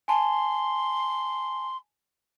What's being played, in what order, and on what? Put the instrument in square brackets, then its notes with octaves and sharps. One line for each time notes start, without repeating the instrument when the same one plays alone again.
[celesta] G#5 A5 [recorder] C6